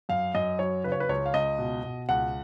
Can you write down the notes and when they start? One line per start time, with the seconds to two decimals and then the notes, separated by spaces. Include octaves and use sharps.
0.09 F#2 F5
0.35 F#2 D#5
0.59 F#3 C#5
0.84 C#3 B4
0.92 C#5
1.00 B4
1.09 C#2 C#5
1.26 F5
1.34 C#2 D#5
1.58 B2
1.83 B2
2.09 C#2 F#5